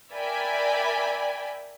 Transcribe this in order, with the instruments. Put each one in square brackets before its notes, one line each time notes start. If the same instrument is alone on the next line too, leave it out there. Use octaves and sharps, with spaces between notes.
[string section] A#4 D5 E5 G5 G#5 B5